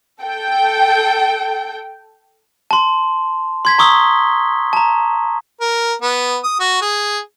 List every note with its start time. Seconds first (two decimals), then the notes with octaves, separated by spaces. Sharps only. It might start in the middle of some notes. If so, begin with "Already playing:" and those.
0.21 A4 G5
2.71 A5 C6
3.65 C6 G#6 B6
3.78 A#5 C#6 D#6 E6 G7
4.73 A5 A#5
5.61 A#4
6.02 B3
6.44 D#6
6.60 F#4
6.81 G#4